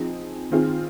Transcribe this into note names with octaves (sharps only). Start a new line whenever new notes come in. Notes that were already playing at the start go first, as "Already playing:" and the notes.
Already playing: F3 C4 D#4 G#4
D#3 C4 F4 G#4